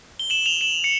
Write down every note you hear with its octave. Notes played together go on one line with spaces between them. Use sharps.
G7
E7 F#7
F7 G7
E7 F#7
C#7